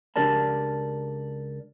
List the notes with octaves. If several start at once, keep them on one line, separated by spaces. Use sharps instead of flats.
C#2 D4 G4 A#4 D5 A5